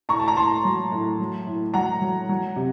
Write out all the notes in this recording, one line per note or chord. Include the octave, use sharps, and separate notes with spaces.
A2 A#5 C#6
A5
A#5
A2 A5 C6
F#3
A2
F#3
A2
F#3 F#5 A#5
F#3
F#3
C3